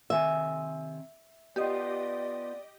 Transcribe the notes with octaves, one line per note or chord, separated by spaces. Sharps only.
C3 D#3 E5 G#5
B3 F4 G4 D5 D#5